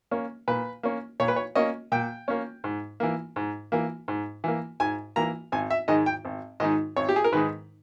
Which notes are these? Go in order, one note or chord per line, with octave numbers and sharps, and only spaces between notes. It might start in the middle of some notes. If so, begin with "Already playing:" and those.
A#3 C#4
A#2 B4
A#3 C#4
A#2 C#5
B4
C#5
A#3 C#4 D#5
A#2 G5
A#3 C#4
G#2
E3 A#3
G#2
E3 A#3
G#2
E3 A#3
G#2 G#5
E3 A#3 A#5
G#1 G#5
E5
G#2 D#3 G#3 D#4 D#5
G5
G#1
G#2 D#3 G#3 D#4 D#5
G#1 C#5
G4
G#4
A#4
G#2 D#3 G#3 D#4 B4